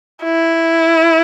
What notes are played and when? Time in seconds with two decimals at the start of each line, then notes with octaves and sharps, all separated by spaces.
0.24 E4